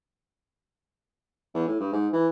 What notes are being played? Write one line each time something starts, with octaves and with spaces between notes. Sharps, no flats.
E2
A2
G2
G#2
E3